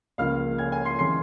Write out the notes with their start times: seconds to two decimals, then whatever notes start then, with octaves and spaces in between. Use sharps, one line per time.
0.18 C#2 C#3 F3 A#3 F5 F6
0.58 G#5 G#6
0.72 G#5 G#6
0.85 C6 C7
0.99 C#3 E3 G#3 C6 C7